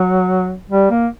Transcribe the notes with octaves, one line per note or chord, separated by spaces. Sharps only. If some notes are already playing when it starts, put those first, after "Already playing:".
Already playing: F#3
G3
A#3